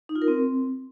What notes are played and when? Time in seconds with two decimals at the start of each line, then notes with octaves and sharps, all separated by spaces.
0.09 D#4
0.15 F4
0.22 A#4
0.28 C4